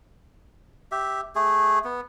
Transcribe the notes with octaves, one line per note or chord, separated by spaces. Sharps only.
G4 E5
A3 G#4
B3